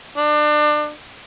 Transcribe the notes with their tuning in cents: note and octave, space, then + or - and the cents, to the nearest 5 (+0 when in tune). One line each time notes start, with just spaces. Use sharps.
D4 +30